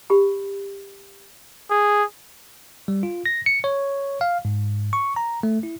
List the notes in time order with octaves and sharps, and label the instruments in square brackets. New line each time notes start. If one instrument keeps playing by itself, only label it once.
[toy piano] G4 B5
[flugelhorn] G#4
[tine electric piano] G3
F4
A#6
C#7
C#5
F5
G#2
C#6
A#5
A3
E4